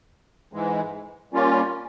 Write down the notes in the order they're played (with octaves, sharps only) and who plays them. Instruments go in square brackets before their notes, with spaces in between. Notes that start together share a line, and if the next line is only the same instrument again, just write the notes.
[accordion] G#2 E3 G#3
G3 A#3 C#4 F4